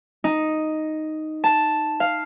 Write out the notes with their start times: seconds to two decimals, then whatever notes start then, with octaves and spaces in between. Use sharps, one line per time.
0.24 D#4
1.44 A5
2.00 F5